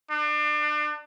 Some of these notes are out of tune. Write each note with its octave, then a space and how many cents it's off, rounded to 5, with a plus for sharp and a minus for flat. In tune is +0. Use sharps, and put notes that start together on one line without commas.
D4 +30